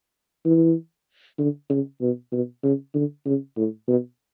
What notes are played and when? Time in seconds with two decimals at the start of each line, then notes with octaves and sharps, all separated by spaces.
0.45 E3
1.39 D3
1.70 C#3
2.01 B2
2.32 B2
2.63 C#3
2.95 D3
3.26 C#3
3.57 A2
3.88 B2